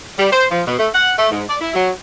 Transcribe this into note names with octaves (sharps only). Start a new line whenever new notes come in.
G3
C5
F3
B2
A3
F#5
A3
G#2
D5
E4
F#3